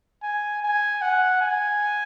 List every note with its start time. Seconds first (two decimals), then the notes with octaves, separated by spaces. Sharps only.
0.22 G#5
0.63 G#5
1.02 F#5
1.41 G#5